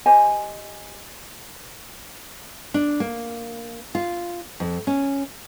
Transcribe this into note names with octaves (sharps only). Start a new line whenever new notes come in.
G4 C5 D#5 G#5
D4
A#3
F4
F2
C#4